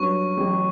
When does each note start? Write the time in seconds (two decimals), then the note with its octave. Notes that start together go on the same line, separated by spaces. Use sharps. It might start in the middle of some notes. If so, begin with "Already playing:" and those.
Already playing: G2 F#3 C#4 F#4 C#6
0.37 A1 A2 F#3